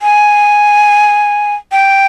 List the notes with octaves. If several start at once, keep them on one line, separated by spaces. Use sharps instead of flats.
G#5
G5